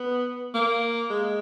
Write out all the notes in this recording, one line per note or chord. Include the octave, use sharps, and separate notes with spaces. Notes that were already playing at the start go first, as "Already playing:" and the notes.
Already playing: B3
A#3
G#3